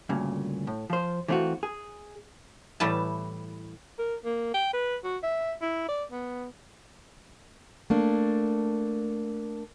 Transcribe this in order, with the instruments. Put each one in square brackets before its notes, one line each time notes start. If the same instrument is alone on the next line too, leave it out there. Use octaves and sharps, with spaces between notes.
[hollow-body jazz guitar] D2 G2 A#2 C#3
A2
F3 C5
E3 A3 C4 D4 F4 F#4
G#4
[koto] A2 E3 G3 B4 A5
[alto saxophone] A#4
A#3
G5
B4
F#4
E5
E4
D5
B3
[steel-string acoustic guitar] A3 A#3 D4